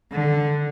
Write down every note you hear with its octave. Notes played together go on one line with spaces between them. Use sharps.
D3